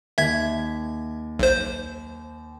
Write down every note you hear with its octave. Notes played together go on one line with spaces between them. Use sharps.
D#2 E5 G#6
B1 C5